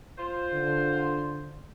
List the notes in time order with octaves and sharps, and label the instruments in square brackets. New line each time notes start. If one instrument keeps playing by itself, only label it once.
[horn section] F4 C5
[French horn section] D3